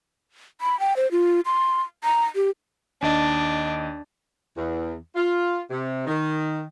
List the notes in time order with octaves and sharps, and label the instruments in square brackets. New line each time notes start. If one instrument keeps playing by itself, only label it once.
[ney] B5
G5
C5
F4
C6
A#5
G4
[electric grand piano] D#2 D#5 [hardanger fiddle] D4
[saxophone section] E2
F4
C3
D#3